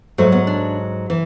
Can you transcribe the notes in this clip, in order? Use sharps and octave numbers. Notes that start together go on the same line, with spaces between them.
G#2 F#3 A3
B3
D4
E3